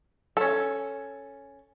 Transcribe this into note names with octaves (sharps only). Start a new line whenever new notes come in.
C#4 A4